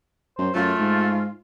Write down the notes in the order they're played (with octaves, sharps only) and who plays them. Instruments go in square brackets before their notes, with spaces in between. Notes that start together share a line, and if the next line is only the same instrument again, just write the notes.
[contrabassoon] F#2 [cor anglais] C5
[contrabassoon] F#2 [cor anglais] A3 [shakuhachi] F4
[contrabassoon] G#2